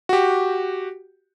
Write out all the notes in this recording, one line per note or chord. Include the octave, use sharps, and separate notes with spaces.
F#4 G4